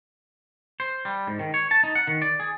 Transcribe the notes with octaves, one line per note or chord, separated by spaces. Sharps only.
C5
G3
G#2
D#3
C#5
A5
D#4
F#5
D#3
D5
G#4